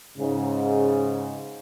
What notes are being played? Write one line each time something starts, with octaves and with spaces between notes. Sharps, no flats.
G#2 C#3